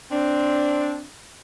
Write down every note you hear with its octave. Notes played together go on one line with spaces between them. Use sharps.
C4 D4